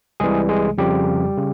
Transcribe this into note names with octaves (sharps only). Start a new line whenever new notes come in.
C2 C3 E3 G3 G#3 G#4
G#3 G#4
F2 C#3 F3 G3 G4
C#3